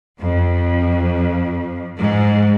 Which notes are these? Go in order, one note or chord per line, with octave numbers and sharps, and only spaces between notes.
F2
G#2